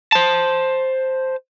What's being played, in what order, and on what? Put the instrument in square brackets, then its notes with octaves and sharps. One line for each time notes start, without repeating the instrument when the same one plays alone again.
[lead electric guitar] C5 A5